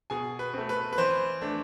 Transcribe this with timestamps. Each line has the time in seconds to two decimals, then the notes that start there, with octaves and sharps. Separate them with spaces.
0.10 B2 G#4 G#5
0.39 B4
0.54 A3 C4
0.69 B4
0.93 B4
0.98 E3 C5
1.42 A3 D4